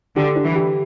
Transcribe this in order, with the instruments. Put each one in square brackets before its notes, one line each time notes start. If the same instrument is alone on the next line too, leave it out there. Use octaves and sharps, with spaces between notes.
[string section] D3 [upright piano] G4
[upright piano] D4
[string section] E3
[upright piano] G4